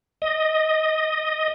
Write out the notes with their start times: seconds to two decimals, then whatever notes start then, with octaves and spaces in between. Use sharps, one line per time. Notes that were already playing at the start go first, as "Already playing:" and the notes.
0.22 D#5